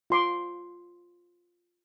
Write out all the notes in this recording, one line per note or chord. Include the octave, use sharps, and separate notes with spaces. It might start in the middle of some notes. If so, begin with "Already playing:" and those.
F4 C6 D6